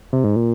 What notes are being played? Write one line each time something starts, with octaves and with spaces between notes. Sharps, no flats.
C3
G#2
A#2